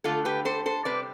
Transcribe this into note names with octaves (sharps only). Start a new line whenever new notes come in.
D3 A3 F4 A4
G4 B4
A4 C5
A4 C5
C3 G3 B4 D5